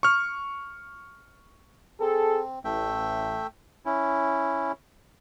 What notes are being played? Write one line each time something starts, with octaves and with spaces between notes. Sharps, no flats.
C#6 F6
C4 G#4 A4
A1 A3 E5 G5
C#4 E4